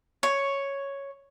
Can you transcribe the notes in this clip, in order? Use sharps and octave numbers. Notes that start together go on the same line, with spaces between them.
C#5